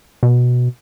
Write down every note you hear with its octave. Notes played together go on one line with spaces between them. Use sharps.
B2